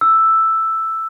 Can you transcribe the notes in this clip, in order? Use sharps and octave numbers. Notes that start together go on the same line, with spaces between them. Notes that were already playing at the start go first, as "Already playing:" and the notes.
E6